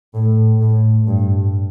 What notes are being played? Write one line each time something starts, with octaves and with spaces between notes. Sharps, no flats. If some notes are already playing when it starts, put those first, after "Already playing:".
A2
A2
G2